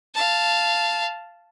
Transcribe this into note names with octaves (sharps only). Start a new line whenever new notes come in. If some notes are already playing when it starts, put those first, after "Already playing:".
F5 A5